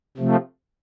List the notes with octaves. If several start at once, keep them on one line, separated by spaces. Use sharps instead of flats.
C3 F3 A3